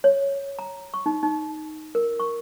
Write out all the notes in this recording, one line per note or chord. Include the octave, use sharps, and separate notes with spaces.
C#5
A#5
C#6
D#4
D#4
A#4
C#6